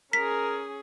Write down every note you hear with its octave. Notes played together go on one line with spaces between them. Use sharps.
C#4 G#4 A#4 B6